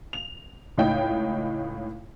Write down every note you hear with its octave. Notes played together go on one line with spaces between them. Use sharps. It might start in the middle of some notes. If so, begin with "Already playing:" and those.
F7
C#2 A2 D#4 C#5 G5